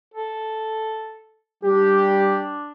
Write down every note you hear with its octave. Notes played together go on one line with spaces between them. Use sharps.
A4
G3 D4 G4